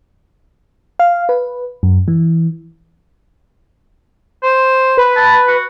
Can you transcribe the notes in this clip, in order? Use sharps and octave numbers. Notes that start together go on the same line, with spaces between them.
F5
B4
F#2
E3
C5
B4
A5
F#4